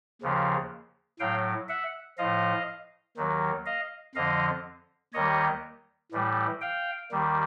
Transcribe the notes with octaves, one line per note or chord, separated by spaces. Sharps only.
D#2 C#3 F3
A2 F#3 F5 G5
E5 F#5
A2 F3 D#5 F5
D#2 D#3 F#3
D#5 F5
F2 D3 F3 D#5 F5
D#2 D#3 G3 C#5 D#5
A2 E3 G3
F5 G5
D#2 D#3 G3